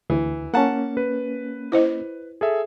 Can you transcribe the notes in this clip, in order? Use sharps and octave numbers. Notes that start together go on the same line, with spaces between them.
D2 E3
A#3 C#4 F#5 A5
B4
E4 C5 D#5
G#4 A4 E5